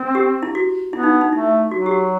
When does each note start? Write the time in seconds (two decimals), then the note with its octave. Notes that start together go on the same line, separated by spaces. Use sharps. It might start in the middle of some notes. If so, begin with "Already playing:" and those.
Already playing: C4
0.15 G4
0.43 E4
0.55 F#4
0.93 B3 E4
1.03 D#4
1.21 D#4
1.32 A3 E4
1.71 F#3 F#4
1.86 G4
1.91 F#4